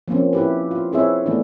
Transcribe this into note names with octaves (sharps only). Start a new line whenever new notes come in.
F3 A#3 C4 C#4
E4 G4 B4
F4
C4 E4 G#4 B4 C#5 E5
E3 A3 B3 D4